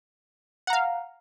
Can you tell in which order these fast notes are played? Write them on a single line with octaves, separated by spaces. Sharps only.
F#5 A#5 F5